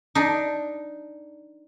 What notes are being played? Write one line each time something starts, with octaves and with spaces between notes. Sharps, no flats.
D4 D#4